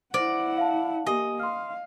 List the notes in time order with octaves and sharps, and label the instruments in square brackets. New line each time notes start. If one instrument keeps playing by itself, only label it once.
[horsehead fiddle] E4 F#5 [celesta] C5 A#6 [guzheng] D5
[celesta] F5 A5
[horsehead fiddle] A#3 [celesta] G4 G#5 [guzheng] D#5
[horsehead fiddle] F5 [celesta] C6 F6